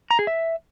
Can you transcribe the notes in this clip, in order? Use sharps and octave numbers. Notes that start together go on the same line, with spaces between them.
A#5
G#4
E5